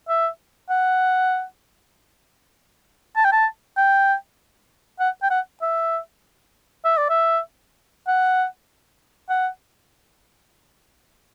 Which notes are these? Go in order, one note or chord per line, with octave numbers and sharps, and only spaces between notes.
E5
F#5
A5
G5
A5
G5
F#5
G5
F#5
E5
E5
D5
E5
F#5
F#5